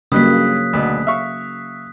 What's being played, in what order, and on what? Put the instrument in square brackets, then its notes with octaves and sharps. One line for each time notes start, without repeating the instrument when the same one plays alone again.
[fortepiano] G2 D#5 [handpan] C#3 F#3 A#3 [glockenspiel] D#6 F#6 B6
[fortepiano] D2 B2
E5 F5 C#6